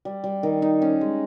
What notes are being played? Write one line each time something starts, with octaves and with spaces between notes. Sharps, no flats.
G3
G3
D#3
D#4
C#4
G#3